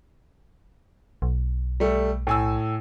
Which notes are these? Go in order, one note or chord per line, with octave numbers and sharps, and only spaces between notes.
B1
G3 A3
A2 G#5 E6